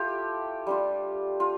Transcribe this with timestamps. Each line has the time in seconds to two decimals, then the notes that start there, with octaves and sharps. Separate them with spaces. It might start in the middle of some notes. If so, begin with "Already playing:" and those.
Already playing: A3 E4 F4 G4 A4
0.67 G3 D4 F4
1.40 F4